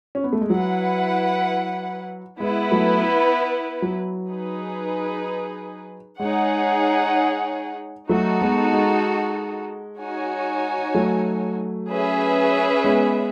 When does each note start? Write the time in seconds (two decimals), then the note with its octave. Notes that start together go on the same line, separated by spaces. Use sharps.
0.15 C#4
0.24 B3
0.33 A3
0.41 G#3
0.50 F#3 E4 B4 F#5
2.39 G#3 B3 E4 B4
2.72 F#3 A3
3.82 F#3
4.30 D#4 G#4 B4
6.20 G#3 D#4 G#4 C#5 F#5
8.09 F#3 A3 D#4 F#4 A4
8.42 G#3 B3
8.73 G#3
9.99 D#4 F#4 C#5 G#5
10.94 F#3 A3
11.90 C#4 G#4 B4 E5
12.84 G#3 B3